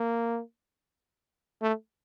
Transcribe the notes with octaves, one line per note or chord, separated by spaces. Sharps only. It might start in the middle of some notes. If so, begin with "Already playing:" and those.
Already playing: A#3
A3